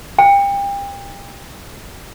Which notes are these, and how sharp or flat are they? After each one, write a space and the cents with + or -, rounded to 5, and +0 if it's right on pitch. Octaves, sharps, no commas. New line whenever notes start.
G5 +35